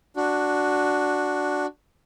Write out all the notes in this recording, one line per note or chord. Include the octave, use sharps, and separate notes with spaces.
D4 F#4